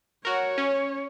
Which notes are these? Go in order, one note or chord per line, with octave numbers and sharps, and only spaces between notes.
F#4 A#4 C#5
C#4